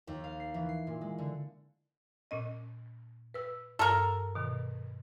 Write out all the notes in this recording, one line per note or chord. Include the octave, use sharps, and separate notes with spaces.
D#2
F5
C7
E3
C7
A#2
G#3
D3
A#2 C#4 D#5
B4 E6
G2 A4 A#4
B2 D#3